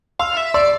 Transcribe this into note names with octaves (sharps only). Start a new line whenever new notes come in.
F5 C6 E6
E5
D5 C6 E6